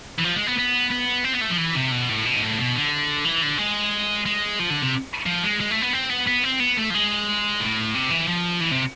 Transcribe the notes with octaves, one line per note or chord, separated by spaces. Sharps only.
E3
F3
G#3
B3
B3
B3
C4
B3
A3
F3
E3
C3
B2
A2
B2
G#2
A2
B2
D3
E3
D3
G#3
G#3
F3
D3
C3
F3
G#3
G#3
A3
B3
C4
B3
B3
C4
B3
A3
F3
G#3
A2
C3
E3
F3
E3
C3